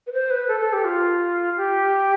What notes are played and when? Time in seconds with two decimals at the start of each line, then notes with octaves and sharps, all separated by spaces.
0.07 B4
0.13 C5
0.30 B4
0.48 A4
0.60 A4
0.73 G4
0.84 F4
1.57 G4